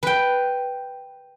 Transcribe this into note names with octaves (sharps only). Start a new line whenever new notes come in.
B4 G5